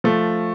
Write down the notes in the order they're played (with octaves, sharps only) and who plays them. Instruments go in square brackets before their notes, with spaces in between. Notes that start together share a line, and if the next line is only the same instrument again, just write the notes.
[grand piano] F3 A3